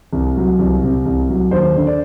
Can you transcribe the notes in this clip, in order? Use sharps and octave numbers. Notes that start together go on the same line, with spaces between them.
C2
F#3
C2
C3
C2
F#3
D#2 C5
D3
D5